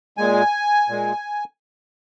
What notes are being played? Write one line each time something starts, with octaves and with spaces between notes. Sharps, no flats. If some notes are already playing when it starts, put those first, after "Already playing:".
A#2 G#3 G#5
A#2 G#3